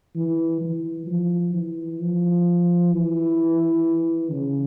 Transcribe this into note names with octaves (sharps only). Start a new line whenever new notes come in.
E3
E3
F3
E3
F3
E3
C#3